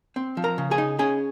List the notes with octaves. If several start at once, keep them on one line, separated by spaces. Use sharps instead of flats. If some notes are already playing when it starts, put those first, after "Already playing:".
C4
F3
A#4 A#5
C#3
G#4 G#5
D#4
C#4 G#4 G#5